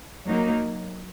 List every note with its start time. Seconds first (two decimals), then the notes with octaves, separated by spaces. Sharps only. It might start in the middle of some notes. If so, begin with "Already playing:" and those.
0.25 F#3 A#3 D#4